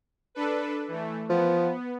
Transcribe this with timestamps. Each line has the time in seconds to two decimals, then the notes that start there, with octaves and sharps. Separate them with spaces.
0.35 D4 A4 B4
0.88 E3 A3
1.30 F3 B3